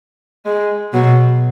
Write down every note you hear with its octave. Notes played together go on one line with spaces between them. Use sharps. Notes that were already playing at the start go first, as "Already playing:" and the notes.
G#3
B2 F#3